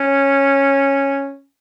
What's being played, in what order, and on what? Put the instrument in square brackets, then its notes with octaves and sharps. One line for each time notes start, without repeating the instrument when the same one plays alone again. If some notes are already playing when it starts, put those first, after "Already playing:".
Already playing: [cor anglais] C#4